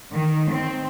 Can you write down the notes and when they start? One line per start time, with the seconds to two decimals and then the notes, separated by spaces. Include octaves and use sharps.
0.11 D#3
0.52 C4